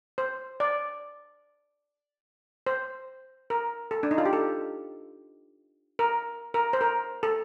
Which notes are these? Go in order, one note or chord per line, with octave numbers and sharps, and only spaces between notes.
C5
D5
C5
A#4
A4
D4
D#4
F4
G4
A4
A#4
A#4
C5
A#4
A4